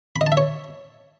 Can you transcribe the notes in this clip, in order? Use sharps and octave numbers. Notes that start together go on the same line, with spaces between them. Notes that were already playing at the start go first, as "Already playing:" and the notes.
B5
D#5
A5
E5
C#5